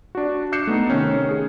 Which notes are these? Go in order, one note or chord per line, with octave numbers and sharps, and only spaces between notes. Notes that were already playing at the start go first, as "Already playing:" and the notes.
D4 F#4
D6 F#6 G6 C7 C#7 E7
A3 B3 D#4
C3 D#3 C#4
G#4